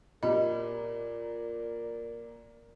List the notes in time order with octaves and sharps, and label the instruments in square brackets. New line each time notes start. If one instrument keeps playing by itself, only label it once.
[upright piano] A#2 B5 [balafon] G4 D#5 [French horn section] A#4 D5